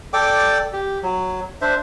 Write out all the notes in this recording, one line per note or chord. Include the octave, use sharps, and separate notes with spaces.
A4 D5 G5 D6
G4
F#3
D4 C5 E5